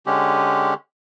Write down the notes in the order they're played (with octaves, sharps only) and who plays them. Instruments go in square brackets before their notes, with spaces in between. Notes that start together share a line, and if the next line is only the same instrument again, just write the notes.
[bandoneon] D3 G#3 C#4 G4